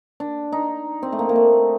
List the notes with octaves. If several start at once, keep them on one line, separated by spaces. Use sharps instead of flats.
D4
D#4
C4
A3
A#3
A#3
A3